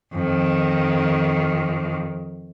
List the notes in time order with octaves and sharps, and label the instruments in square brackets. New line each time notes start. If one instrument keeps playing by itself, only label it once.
[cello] F2 D#3